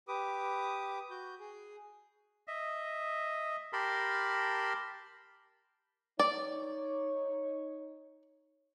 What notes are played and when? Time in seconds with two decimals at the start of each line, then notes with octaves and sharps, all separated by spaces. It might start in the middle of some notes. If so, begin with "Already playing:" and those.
0.08 G4 B4 D6 D#6
1.10 F#4 G6
1.40 G#4
2.48 D#5 E5
3.73 G4 A#4 A5 B5 C6
6.19 D#4 C#5 D5